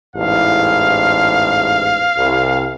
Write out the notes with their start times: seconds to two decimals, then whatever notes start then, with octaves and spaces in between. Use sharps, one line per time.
0.16 A1 E2 G#2 F5
2.17 C2